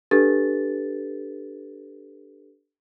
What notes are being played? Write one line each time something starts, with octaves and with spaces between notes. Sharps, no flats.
D4 G4 A4 B4 A6